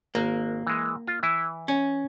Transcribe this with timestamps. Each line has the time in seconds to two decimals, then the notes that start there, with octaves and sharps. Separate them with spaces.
0.15 G#1 A#3
0.67 E3 G#3
1.07 F4
1.23 E3 E4
1.68 C#4